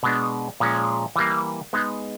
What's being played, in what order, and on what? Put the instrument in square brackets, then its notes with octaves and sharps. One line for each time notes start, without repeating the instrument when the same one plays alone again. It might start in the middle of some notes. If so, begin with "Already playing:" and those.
[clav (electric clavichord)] B2 G#3 B3 D4
A#2 F3 G#3 C#4
E3 G3 A#3
G#3 B3 D#4 G#4